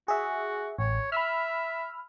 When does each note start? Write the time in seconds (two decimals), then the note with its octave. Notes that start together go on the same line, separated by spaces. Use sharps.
0.08 F#4 G#4 E5
0.79 A1 C#5
1.12 E5 B5 E6 F6